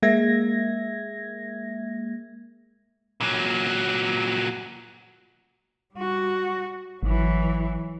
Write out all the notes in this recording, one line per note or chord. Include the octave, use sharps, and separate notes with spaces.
G#3 A#3 E5 G#6 A#6
A#2 F#3
G3 F#4
G#1 E3 F#3